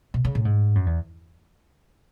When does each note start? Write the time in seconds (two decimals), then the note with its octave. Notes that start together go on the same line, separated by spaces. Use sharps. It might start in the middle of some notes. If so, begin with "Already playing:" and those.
0.14 B2
0.25 C#3
0.35 A2
0.45 G#2
0.75 F#2
0.86 E2